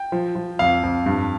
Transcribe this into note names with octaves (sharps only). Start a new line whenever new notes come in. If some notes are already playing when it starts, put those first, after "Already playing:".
Already playing: G5
F3
F3
F2 F5
F2
G2